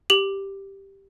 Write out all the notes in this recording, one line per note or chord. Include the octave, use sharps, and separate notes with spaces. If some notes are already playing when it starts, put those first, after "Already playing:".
G4 F#7